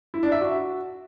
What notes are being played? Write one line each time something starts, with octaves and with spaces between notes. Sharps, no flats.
E4
D4
E5
F#4